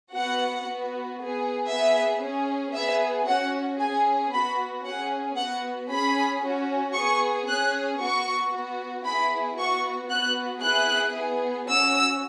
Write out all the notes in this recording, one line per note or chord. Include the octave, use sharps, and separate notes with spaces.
B3 F#4 F#5
B3 F#4
B3 G#4
B3 G#4 E5
C#4 G#4
B3 G#4 E5
C#4 F#4 F#5
C#4 G#4 G#5
B3 F#4 B5
C#4 G#4 F#5
B3 F#4 F#5
C#4 G#4 B5
C#4 F#4
B3 G#4 C#6
C#4 G#4 F#6
B3 F#4 C#6
B3 F#4
B3 E4 G#4 B5
B3 F#4 C#6
B3 F#4 F#6
B3 E4 G#4 F#6
B3 G#4
C#4 F#4 E6